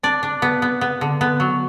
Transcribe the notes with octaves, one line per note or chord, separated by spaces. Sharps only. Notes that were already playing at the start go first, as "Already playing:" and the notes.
D4 D5
D4
B3
B3
B3
D3
B3
F#3